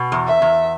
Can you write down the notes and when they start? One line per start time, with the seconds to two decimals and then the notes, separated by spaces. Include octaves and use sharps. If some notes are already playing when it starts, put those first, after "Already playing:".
Already playing: B2
0.12 E2
0.27 E5
0.42 E2